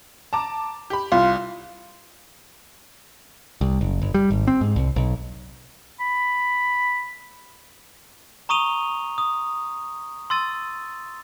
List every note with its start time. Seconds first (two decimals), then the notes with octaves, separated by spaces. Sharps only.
0.33 A5 A#5 D6
0.90 G4 B5
1.12 C2 F4
3.61 C2
3.81 F#1
4.02 G1
4.14 G3
4.30 G#1
4.47 C4
4.61 G#2
4.76 C2
4.96 B1
6.00 B5
8.49 A#5 C#6 D#6 D#7 F7 G7
9.18 D#6
10.30 C6 E6 A6 D#7